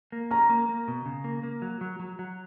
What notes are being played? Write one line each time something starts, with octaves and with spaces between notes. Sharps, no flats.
A#3
C#4 A#5
A#3
A#3
B2
C#3
A#3
A#3
F#3
F#3
F#3
F#3